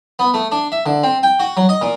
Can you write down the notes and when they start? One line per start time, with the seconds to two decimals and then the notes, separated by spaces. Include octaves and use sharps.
0.19 B3
0.34 A3
0.52 D4
0.72 E5
0.86 D3
1.03 C4
1.23 G5
1.40 F#4
1.57 F#3
1.69 D#5
1.82 A#2